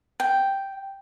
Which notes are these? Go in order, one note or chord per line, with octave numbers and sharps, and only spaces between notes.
G5